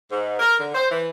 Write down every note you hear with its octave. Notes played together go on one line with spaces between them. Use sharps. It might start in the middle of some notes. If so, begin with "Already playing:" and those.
G#2
A#4
D3
C5
E3